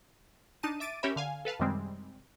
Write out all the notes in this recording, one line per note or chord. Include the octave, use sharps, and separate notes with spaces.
D4 D#4 A5 D#7
E5 D6 A6 D7 D#7
C#4 G4 A#4 C#5 E5 B5
D3 F5 G#5
A4 B4 F5 A5
F#2 C3 D#3 G3 G#3 C4